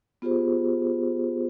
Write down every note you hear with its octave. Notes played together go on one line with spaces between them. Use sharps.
B3 F4 G4 G#4 C5